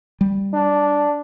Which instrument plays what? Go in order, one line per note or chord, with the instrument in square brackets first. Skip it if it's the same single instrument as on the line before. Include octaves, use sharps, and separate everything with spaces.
[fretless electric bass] G3
[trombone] D4